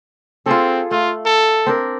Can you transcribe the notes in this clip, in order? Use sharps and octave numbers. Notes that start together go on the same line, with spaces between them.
C4 F4 G#4 A4
A3 F4
A4
C4 D4 A#4